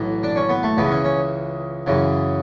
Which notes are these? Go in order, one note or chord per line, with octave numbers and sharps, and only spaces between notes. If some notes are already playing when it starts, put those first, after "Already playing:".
Already playing: B1 A2 E3
D4
C#4
B3
A3
C#2 C#3 E3 B3
C#4
C#4
F#2 C#3 E3